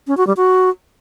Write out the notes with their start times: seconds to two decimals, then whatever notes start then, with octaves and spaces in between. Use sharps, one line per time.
0.07 C#4
0.17 F#4
0.27 G3
0.37 F#4